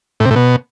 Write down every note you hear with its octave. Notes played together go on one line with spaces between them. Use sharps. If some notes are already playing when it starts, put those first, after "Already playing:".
A2
C3
A2
B2